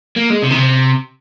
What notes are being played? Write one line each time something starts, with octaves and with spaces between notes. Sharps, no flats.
A#3
G#3
C3
D#3
C3